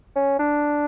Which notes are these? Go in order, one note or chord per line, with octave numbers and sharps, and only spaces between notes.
C#4
D4